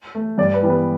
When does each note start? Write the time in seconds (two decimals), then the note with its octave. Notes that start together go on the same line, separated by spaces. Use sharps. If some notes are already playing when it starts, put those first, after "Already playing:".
0.15 A3
0.38 G2 D5
0.54 B4
0.63 E3 G3 B3
0.70 B4